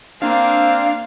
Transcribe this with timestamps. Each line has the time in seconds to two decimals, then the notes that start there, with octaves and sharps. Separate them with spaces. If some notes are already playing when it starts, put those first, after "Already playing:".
0.22 A#3 C4 D4 F5